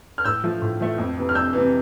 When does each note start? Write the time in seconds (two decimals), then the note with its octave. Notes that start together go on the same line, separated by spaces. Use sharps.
0.18 F6
0.24 A2 E6 G6
0.44 F3 A3
0.62 A2
0.81 F3 A3
0.98 F2
1.17 C3 E3
1.29 F6
1.35 F2 E6 G6
1.53 C3 E3